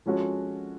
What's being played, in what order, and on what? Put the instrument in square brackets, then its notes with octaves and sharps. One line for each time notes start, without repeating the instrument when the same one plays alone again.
[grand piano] F3 G#3 C#4 F#4 A4